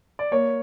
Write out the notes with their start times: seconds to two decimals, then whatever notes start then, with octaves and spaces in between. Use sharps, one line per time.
0.19 D5
0.31 A#3 C#5